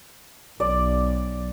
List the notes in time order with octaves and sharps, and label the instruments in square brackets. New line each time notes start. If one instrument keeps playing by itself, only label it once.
[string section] B1 [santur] D5